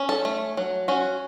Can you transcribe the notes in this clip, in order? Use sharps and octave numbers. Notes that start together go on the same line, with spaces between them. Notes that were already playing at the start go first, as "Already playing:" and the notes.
Already playing: C#4
A4
A3
F#3
C#4 F#4